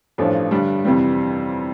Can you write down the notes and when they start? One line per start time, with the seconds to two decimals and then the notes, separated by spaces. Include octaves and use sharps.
0.18 A1 G2 F3 A3 D4
0.51 G2 D3 G3 D4
0.85 F2 C3 E3 G3